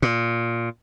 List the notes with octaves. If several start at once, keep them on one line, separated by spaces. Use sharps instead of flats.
A#2